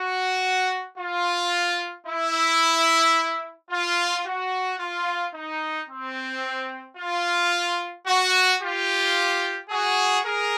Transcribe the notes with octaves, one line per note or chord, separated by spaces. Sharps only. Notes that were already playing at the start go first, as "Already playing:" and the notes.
Already playing: F#4
F4
E4
F4
F#4
F4
D#4
C4
F4
F#4
F4 G4
F#4 G#4
G#4 A#4